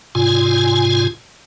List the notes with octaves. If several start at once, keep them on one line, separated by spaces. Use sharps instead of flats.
G#2 C3 F4 G#5